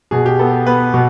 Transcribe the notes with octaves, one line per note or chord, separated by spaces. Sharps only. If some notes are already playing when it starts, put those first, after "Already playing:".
B2 G#4
G4
B3 A4
B3 B4
B2